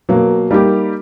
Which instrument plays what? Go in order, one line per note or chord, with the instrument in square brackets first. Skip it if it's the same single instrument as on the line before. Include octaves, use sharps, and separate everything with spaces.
[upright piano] B2 F#3 A#3
G3 A#3 D#4 G4